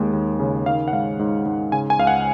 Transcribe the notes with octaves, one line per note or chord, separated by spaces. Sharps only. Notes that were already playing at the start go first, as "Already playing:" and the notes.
Already playing: D#2 G#3
D#2
C#3
D#3 F5
F#5
G#2 F5
G#2
G#2
C#3 G#5
G#5
C#2 F5
F#5